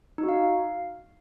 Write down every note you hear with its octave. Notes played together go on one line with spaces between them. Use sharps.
D#4
F#4
F5